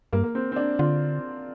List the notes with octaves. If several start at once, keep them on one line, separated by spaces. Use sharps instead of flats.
G2 A#3
A#3
C4
C4
D4
D3 F4